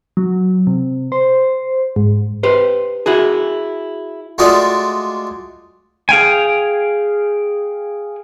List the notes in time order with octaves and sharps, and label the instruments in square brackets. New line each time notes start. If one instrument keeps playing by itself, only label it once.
[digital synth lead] F#3
C3
C5
G#2
[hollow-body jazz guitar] G4 B4 C5
E4 F#4 G#4
[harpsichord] G#3 A3 F4 F#4 D5 D#5
[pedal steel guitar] G#4 F5 G5 G#5